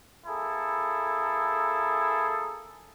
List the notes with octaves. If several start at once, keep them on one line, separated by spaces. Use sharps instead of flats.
A#3 E4 G#4 A4